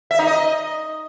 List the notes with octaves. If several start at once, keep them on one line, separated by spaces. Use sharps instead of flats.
E5
D#4
D#5